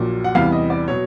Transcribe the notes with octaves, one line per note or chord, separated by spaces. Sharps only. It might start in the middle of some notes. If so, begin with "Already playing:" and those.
Already playing: A#1 A#2 F#3
F#5
E2 C3 E3 G3 F5
D#5
D5
B2 F#3 C#5